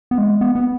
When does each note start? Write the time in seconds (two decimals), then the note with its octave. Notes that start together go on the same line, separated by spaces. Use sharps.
0.11 B3
0.18 G#3
0.41 B3
0.55 B3